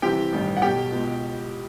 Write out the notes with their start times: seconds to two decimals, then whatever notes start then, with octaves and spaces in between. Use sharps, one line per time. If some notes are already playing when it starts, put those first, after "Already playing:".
0.02 C2 C3 E3 G4 G5
0.32 A1 G2 D#3
0.57 F#5
0.62 B1 B2 G4 G5
0.92 C#2 B2